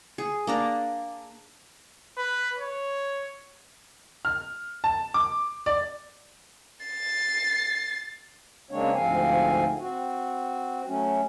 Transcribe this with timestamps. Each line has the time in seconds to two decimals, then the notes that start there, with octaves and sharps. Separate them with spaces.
0.18 G#4
0.47 A#3 D4 A#5
2.18 B4
2.58 C#5
4.25 F6
4.84 A5
5.14 D6
5.66 D5
6.85 A6 C7
8.71 C#3 G#3 A#3 C4 D4 C#5
8.95 D2 G#2 F3 C4 F5 G#5
9.79 C4 F#4
10.87 F#3 A3 C#4